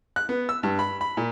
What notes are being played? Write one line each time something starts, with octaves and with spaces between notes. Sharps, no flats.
F#6
B3
E6
G2
B5
B5
A#2